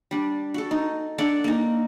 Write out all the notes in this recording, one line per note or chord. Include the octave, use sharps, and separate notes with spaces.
G3 D4
F#4 A4
D#4
D4 A4 D5 F#5
A#3 D#4